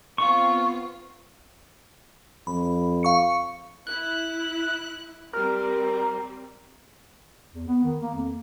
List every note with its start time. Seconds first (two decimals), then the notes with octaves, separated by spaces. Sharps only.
0.18 B3 C4 F4 C#6
2.47 F2 B5
3.03 F5 C#6 C#7
3.87 E4 F#6
5.33 G3 C4 A#4
7.54 E2
7.68 B3
7.84 D#3
8.00 A#3
8.15 F2